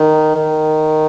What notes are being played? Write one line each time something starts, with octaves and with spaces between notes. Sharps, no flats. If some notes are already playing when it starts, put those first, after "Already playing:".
Already playing: D#3
D#3